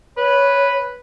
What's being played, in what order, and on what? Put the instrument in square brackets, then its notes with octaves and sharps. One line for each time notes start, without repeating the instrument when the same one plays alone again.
[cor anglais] B4 [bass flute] C#5